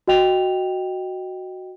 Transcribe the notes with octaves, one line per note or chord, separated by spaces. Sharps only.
F#4 D#5 G5 F7